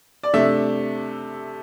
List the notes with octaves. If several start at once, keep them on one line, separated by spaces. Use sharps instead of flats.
D5
C3 A3 D4 E5